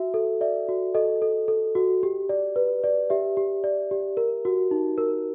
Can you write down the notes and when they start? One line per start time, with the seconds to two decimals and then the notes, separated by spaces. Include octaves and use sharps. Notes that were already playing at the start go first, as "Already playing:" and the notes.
Already playing: F#4 E5
0.14 A4
0.41 D5 E5
0.69 F#4
0.95 A4 D#5
1.22 A4
1.48 A4
1.75 F#4
2.03 G4
2.29 D5
2.56 B4
2.84 D5
3.10 G4 E5
3.37 G4
3.64 D5
3.91 G4
4.17 A#4
4.45 F#4
4.71 D#4
4.98 A#4